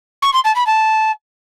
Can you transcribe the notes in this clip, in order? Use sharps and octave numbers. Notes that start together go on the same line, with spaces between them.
C#6
C6
A5
B5
A5